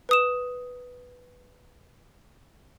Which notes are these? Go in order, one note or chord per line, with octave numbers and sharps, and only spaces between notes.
B4 D#6 E7